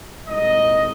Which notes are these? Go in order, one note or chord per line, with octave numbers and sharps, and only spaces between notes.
C2 A#2 G#3 D#4 D#5